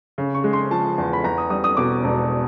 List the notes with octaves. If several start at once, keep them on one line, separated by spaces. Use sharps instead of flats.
C#3
C#6
G#3
C6
F3 A5
E2
B5
E2 A#5
D#6
G3 D#6
D#6
B2 D6
E1